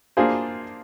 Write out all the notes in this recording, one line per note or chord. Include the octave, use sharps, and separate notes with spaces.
A#3 D4 F4 G#4 C5